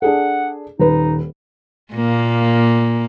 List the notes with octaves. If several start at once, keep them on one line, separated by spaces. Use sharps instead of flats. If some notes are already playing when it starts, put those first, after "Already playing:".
D4 G#4 A4 F#5
D#1 D#4 B4
A#2 A#3